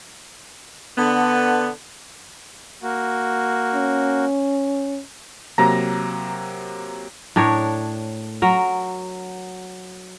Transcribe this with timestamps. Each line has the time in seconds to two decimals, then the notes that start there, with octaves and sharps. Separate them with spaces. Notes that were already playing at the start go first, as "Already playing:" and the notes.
0.98 D3 B3
2.83 A#3 F#4
3.74 C#4
5.58 C3 F#3 A#3 A#5
7.36 A2 D4 A#4 C#5
8.42 F#3 A#4